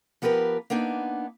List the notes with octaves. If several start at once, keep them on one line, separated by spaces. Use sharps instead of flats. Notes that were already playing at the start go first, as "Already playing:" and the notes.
F3 B3 G4 A#4 B4
A#3 B3 D4 D#4